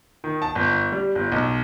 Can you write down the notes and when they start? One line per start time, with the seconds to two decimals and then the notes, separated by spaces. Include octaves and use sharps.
0.24 D#3
0.42 A5
0.55 G1
0.92 G3
1.15 G1
1.32 B1